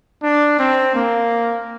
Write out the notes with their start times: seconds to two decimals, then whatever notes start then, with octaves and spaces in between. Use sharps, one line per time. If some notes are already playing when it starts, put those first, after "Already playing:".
0.23 D4
0.59 C4
0.95 A#3